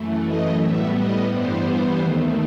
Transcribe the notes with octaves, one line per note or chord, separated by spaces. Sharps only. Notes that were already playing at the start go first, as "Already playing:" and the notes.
Already playing: F#2 E3 A3
D#5
A2 G3 B3 E5
D#5
G2 E3 G3 B3 C5
D#2 D#3 A3